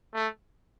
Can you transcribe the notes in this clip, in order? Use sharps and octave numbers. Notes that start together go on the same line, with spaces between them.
A3